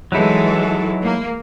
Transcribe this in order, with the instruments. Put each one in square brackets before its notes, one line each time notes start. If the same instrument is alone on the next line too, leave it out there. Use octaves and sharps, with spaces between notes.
[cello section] E3 G#3 A4 [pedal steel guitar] F#3 D#4 E4
[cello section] A#3